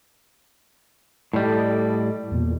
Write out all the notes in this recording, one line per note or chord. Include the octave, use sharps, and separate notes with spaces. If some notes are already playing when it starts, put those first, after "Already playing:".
A2 G3 A4 D5 D#5
E2 A#2